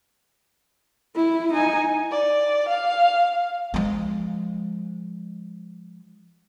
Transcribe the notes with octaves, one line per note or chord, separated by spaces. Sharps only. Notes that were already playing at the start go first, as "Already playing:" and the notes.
E4
D#4 G#5
D5
F5
F3 G#3